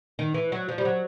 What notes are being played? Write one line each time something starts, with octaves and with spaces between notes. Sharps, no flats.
D#3
E3
F#3
F3
G3
F#3